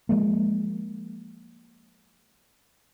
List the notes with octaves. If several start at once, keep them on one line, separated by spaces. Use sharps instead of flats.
F3 G#3 A#3